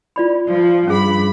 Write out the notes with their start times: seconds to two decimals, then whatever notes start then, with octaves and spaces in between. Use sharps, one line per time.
0.16 F4 D5 B5
0.49 F3
0.87 G2 C#4 G#4 B5